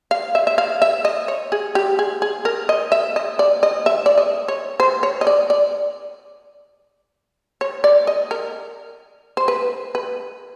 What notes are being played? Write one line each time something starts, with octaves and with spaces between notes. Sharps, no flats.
F5
E5
E5
F5
E5
D#5
C#5
G#4
G4
G#4
G#4
A#4
D#5
E5
D#5
D5
D#5
E5
D5
D#5
C#5
C5
C#5
D#5
D5
D5
C#5
D5
D#5
A#4
C5
B4
B4